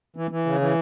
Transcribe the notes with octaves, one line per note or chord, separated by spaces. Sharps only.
E3
E3
C#3
E3